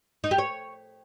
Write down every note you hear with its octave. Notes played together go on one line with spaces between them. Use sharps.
D#4
G4
C#5